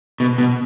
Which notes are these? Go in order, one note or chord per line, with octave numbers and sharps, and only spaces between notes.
B2
B2